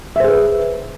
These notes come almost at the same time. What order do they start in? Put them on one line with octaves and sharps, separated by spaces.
E5 C5 G#4 B4